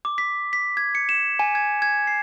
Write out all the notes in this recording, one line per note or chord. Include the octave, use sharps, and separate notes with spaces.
D6
B6
B6
G#6
C#7
E7
G#5
G#6
G#6
C7